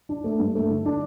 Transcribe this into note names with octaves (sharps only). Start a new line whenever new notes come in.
D4
A3
G2
A3
D3
D4